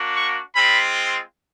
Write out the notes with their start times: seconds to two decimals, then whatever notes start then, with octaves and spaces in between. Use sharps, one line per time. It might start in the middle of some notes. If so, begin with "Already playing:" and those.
Already playing: A#3 D4 F#4
0.15 C#6
0.55 G#3 C4 F4 B5